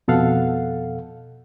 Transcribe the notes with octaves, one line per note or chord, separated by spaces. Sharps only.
F2 B2 A4 F5 F#5